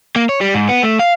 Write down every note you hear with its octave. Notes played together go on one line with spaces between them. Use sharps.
A#3
C#5
G3
G#2
B3
A3
F5